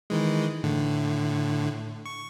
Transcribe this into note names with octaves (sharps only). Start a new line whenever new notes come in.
D#3 E3 G#3
A2 D3
C#6